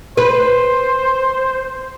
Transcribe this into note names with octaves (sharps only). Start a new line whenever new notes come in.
B4 C5